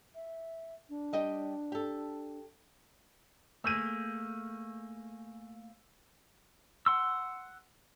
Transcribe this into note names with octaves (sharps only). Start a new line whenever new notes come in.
E5
D4
G3 D#5 G5
G4 A4
A3 A#3 G#4 E6 G6 D#7
F#5 C6 E6